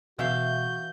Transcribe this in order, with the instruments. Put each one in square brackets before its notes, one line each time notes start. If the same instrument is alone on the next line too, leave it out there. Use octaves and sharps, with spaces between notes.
[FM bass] B2 [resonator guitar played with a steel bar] E3 E5 F5 [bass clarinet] F#4 [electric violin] G6